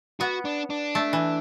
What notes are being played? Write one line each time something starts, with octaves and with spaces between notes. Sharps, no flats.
B3 F#4
D4
D4
A3
E3